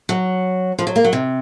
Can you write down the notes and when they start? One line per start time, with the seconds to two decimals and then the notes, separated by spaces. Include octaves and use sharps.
0.09 F#3
0.79 F3
0.87 F#3
0.96 A#3
1.04 F#3
1.13 C3